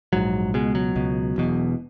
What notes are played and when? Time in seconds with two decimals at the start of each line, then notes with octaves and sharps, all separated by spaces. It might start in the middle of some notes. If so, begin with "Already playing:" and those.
0.13 A#1 G#2 F#3
0.54 C#2 B2 G#3
0.75 F#3
0.96 C#2 B2
1.36 E1 E2 B2